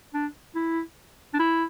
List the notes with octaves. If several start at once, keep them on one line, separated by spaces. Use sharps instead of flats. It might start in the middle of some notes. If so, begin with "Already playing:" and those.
D4
E4
D4
E4